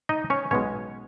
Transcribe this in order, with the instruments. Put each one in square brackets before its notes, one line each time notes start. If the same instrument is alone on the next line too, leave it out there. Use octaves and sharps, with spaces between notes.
[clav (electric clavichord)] D#4 D#5
C#4 C#5
B1 B2 G#3 C#4 C#5